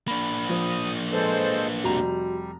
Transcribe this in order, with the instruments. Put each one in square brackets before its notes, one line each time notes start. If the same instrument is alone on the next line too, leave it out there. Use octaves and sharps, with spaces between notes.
[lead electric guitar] A#3 D4 [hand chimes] B5
[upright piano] F3 [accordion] D#6
[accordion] G#3 A4 C5 [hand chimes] B4
[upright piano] F1 A#5 F7 [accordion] G3 [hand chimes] F#4